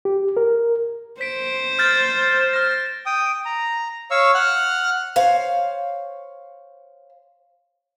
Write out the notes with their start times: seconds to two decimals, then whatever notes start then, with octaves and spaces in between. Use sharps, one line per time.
0.05 G4
0.37 A#4
1.21 C5 B6 D7
1.79 F6 G6 A6
2.53 F6 A#6
3.06 G5 D#6
3.45 A#5
4.11 C#5 F5 C#6 E6
4.35 F#5 F6 F#6
5.16 C5 C#5 F5